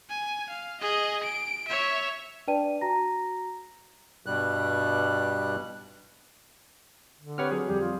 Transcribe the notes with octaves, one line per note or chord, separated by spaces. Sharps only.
G#5
F5
G#4 D#5
D7
C#5 E5
D4 B4 D5 G5 A5 D#7
F#4 A#5 A#6
G2 B2 G3 F#6
D3
C4 G4 B4 C#5 F#5 F6
F#3 G#4
F2 G3 G4
F4